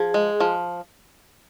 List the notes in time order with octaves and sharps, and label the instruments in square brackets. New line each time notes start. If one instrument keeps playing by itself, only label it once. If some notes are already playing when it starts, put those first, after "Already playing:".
Already playing: [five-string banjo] F3 [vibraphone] G#4
[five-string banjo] G#3
F3